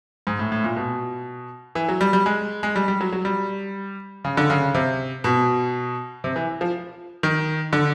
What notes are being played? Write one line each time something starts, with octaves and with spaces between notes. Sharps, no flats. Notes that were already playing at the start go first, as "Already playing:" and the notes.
G#2
A2
A2
A#2
B2
E3
F#3
G3
G3
G#3
G#3
G3
G3
F#3
F#3
G3
C#3
D3
C#3
C3
B2
C3
E3
F3
D#3
D3